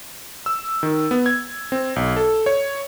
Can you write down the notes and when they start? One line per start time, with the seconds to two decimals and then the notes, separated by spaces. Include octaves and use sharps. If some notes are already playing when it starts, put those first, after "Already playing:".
0.46 E6
0.83 D#3
1.11 B3
1.26 G#6
1.72 C4
1.96 B1
2.16 A4
2.46 C#5